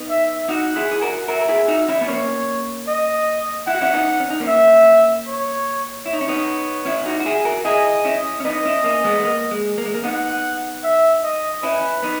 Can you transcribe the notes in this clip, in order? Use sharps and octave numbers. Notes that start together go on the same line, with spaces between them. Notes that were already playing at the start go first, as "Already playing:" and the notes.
Already playing: B3 D#4
E5
D#4 F#4 F#5
E4 G#4
G#4
F#4 A#4
F#4 A#4 E5
A#4
E4 G#4
D#4 F#4
C#4 E4
B3
A#3 C#4 C#5
D#5
E4 F#5
F#4
C#4 E4
B3 D#4
C#4
D#4
A#3 C#4
E5
C#5
E4 C#5
D#4
C#4
B3 D#4
C#4 E4
D#4 F#4
F#4
E4 G#4
F#4 A#4
E4 G#4 D#5
C#4 E4
C#4
B3 D#4 D#5
C#4 E4
A#3 C#4
G#3 B3
G#3
A#3
G#3
A#3
G#3
A#3
B3 D#4 F#5
E5
D#5
C#4 E4 B4
B3 D#4